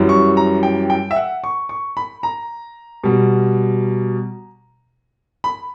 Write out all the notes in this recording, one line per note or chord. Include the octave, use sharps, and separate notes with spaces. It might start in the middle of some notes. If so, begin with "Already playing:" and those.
Already playing: F#2 E3 G3
C#6
A#5
G5
G5
E5
F#5
C#6
C#6
B5
A#5
B2 G3
B5